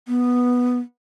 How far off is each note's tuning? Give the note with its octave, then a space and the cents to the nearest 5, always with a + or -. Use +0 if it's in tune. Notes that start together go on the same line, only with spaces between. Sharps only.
B3 -5